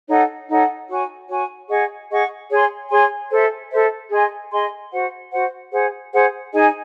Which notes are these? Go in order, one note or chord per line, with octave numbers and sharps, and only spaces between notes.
D#4 A4 C#5 F#5
D#4 A4 C#5 F#5
F#4 C#5 G#5
F#4 C#5 G#5
G#4 D#5 F#5 C#6
G#4 D#5 F#5 C#6
G#4 C#5 G#5 C6
G#4 C#5 G#5 C6
A4 C5 E5
A4 C5 E5
G#4 D#5 G#5 C6
G#4 D#5 G#5 C6
F#4 C5 F#5
F#4 C5 F#5
G#4 C5 F#5
G#4 C5 F#5
D#4 G#4 D#5 G#5